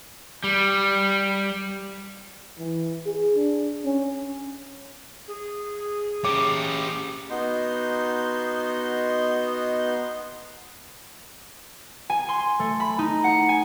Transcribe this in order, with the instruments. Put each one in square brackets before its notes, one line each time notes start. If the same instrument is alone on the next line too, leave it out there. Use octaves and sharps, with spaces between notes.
[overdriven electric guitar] G3
[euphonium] E3
G#4
D4
C#4
[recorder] G#4
[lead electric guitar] C#4 G4 [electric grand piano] D6
[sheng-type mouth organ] B3 D#4 F#4 D#5 C6 G6
[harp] G#5
C6
A3
B5
D#4
F#5
G#5